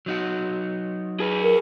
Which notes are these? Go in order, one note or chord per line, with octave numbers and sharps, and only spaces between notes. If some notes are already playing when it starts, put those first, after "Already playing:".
F#3 D#4 F#4
G#4 B4
A#4